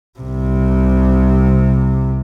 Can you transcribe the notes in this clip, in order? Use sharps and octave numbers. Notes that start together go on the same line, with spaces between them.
C2 C3